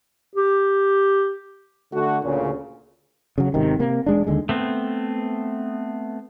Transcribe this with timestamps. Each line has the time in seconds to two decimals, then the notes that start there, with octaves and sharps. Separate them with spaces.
0.35 G4
1.92 D3 A3 F#4
2.22 D2 A#2 C#3
3.38 C#3 F#3
3.54 G#1 C3 D#3
3.79 C3 A#3
4.06 E1 G#3 D4
4.27 D#2 D3 G#3
4.49 A3 B3 C4